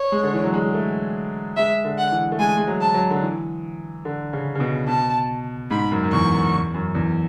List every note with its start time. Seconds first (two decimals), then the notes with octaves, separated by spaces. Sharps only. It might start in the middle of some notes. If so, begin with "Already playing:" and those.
Already playing: C#5
0.12 G#3
0.23 D3
0.34 E3
0.44 F#3
0.54 G#3
0.74 A3
1.57 G#3 E5
1.85 D3
1.98 F#5
2.12 E3
2.32 A3
2.39 G#3 G#5
2.57 G#3
2.67 F#3
2.81 A5
2.94 F#3
3.11 D3
3.22 E3
4.05 D3
4.33 C#3
4.55 C#3
4.60 B2
4.88 B2 A5
5.71 G#2 B5
5.92 F#2
6.04 F#2
6.13 E2 C#6
6.33 F#2
6.54 E2
6.74 F#2
6.95 E2